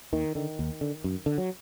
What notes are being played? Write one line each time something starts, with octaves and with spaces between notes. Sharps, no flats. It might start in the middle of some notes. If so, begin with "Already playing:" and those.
D#2 D#3
D3 D#3
D#2
D3
F#2
D3
F#3